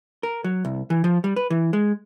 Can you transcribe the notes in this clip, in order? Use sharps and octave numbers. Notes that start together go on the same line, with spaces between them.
A#4
F#3
C2
E3
F3
G3
B4
E3
G#3